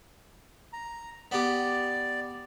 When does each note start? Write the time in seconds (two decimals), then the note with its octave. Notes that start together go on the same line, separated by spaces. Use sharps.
0.73 A#5
1.32 B3 G4 D5